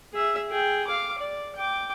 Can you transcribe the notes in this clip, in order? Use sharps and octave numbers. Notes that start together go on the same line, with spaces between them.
G#4 E5
G#4 G5
F5 D6
D5
G5 D6